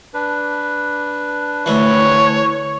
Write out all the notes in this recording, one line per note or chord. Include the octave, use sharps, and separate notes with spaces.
D4 B4
D2 E3 C#5